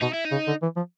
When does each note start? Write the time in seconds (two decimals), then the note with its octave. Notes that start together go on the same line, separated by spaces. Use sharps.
0.02 B2 D#4
0.14 E4
0.25 D#4
0.31 C#3
0.47 D3
0.62 E3
0.76 F3